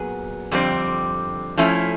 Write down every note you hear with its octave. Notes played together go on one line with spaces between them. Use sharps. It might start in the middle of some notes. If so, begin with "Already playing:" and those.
Already playing: A#2 F#3 B3 G#4
F2 D3 G3 C4
F3 A3 C#4 E4